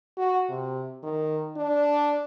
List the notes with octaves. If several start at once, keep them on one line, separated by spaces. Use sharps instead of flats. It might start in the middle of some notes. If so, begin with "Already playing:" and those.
F#4
C3
D#3
D4